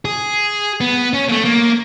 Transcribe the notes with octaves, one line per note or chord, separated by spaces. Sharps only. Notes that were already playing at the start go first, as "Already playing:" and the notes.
G#4
B3
C#4
A3 A#3
A#3